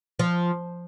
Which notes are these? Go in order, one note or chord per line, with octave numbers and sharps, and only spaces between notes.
F3